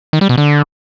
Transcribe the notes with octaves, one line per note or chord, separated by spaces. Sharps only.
D#3
G3
B2
D3